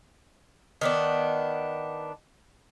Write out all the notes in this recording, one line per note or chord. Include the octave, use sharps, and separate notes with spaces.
D#3 B3 D4